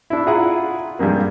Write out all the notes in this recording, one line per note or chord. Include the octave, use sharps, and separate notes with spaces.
D4 E4
E4 F4 G#4 F#5 A#5
G2 G3 G#3 A#3